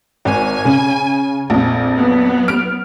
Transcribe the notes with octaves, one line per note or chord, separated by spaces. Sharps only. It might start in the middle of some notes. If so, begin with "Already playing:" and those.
G#1 G#5
C#3
A#1 F2
F#3 B3
F6 D7